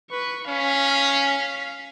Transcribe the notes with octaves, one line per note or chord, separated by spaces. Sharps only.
B4 C#6
C#4 F5 B6